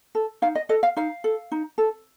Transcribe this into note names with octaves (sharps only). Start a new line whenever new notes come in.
A4
D#4 F5
D#5
A4 D#5
F5
D#4 F5
A4
D#4
A4